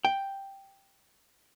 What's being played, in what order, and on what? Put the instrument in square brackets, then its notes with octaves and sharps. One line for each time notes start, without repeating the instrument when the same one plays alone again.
[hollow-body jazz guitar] G5